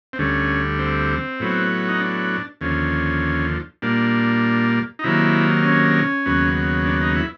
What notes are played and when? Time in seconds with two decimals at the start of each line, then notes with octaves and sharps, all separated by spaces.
0.13 C4
0.19 D2 D3 G3 C#4
0.79 C4
1.40 A2 F#3 B3
1.89 D#4
2.00 D4
2.61 D#2 D3 F3 C#4
3.82 A#2 G3 A#3 D4
4.99 D#4
5.04 C3 D#3 F#3 A#3 E4
5.64 C#4
6.25 D#2 C#3 F#3 B3
6.86 D4
7.01 D#4
7.16 E4